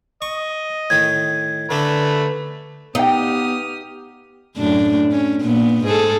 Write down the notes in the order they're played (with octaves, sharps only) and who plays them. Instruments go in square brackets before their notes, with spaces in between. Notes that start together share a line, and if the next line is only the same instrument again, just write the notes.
[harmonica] D#5 [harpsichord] C#6
[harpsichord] A2 D#3 [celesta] G#6
[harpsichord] D3 D4 [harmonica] A3 B4
[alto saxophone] B3 [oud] D#4 [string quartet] G4 D#6 F6 [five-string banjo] F5 G5
[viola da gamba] F#2 A2 D4
C#4
A#2 B3
G#2 G#4 A4